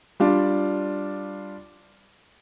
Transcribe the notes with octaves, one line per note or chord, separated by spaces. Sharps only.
G3 D4 F4